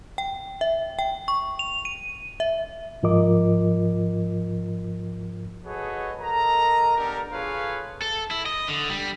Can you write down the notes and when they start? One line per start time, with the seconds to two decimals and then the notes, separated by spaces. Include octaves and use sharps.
0.18 G5
0.61 E5
0.99 G5
1.28 C#6
1.59 F7
1.85 D#7
2.40 E5
3.03 G#2 F3 F4 A#4 D#5 D6
5.65 F#4 G#4 A4 B4 C#5 D#5
6.20 A4 A#4 D#5 A#5
6.97 B3 D4 G4 A4 A#4
7.32 F4 G#4 A4 B4 C#5 F5
8.02 A4
8.31 E4
8.46 D#5
8.68 D3
8.90 G3